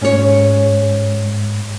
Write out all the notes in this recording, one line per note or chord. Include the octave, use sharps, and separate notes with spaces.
G#2 C#4 C#5